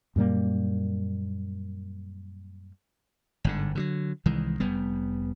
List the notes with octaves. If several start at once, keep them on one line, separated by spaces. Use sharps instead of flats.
F#2 A#2 G3 A#3
G1 G#2 D3
D3 E3 F#3
C2 D#3 E3 G#3
F1 G3 B3